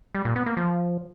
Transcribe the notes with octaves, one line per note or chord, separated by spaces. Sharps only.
G3
A#2
B3
A#3
F3